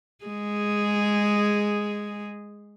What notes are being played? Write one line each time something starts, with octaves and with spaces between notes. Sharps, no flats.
G#3 G#4